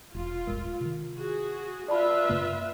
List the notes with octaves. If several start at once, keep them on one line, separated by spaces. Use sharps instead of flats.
E1 F4
D1 G1 G#3 A#4
C3 D#3
F#4 G#4
F4 B4 D5 E5 A5 B5
F#2 C#3 A#3